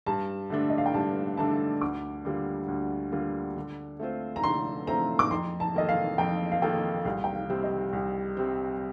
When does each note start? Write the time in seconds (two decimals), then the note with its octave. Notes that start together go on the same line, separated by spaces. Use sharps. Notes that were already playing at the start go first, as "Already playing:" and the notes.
0.06 G2 A5
0.50 D3 A3 D4
0.70 D#5
0.78 F5
0.86 G5
0.94 G2 A5
1.37 D3 A3 D4 A5
1.81 D2 D6
2.25 D3 G3 A#3 F4
2.68 D2
3.12 D3 G3 A#3 F4
3.56 D3
3.99 A3 C4 F4 C5
4.36 A#5
4.44 D3 C6
4.87 A3 C4 F4 C5 A#5
5.19 D6
5.30 F2 C6
5.60 A5
5.74 D#3 A#3 F4 A4 D#5
5.89 F5
6.18 F2 G5
6.52 F5
6.62 D#3 A#3 F4 A4 G5
7.05 C2 F5
7.24 G5
7.35 F5
7.49 C3 G3 C4
7.64 D#5
7.93 C2
8.37 C3 G3 C4